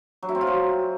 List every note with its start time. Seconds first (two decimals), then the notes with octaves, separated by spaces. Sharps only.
0.23 F#3
0.29 E4
0.35 C4
0.41 F4
0.47 F#3